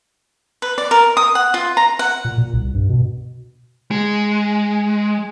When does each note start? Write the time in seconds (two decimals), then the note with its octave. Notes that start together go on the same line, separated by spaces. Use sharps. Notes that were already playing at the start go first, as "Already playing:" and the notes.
0.62 B4
0.78 D5
0.91 A#4
1.17 D#6
1.35 F#5
1.54 F4
1.77 A#5
1.99 F#5
2.25 A#2
2.38 A#2
2.54 C2
2.74 G2
2.89 B2
3.91 G#3